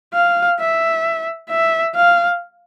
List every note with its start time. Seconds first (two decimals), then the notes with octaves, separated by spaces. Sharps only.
0.14 F5
0.60 E5
1.50 E5
1.95 F5